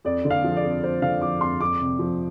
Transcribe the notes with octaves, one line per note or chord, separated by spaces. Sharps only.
F2 D5
D3
F5
F3
D5
F2
F2 C5
D3 F5
F3 D6
F2 C6
F2 D6
C3
F3